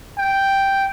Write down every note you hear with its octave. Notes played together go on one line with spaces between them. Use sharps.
G5